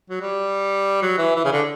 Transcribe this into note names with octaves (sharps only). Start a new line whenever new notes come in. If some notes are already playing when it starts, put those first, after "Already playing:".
F#3
G3
F#3
E3
E3
C#3
D3